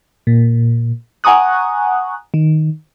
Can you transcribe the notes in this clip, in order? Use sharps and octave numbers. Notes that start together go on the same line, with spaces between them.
A#2
F#5 G#5 A#5 C#6 D#6 F#6
D#3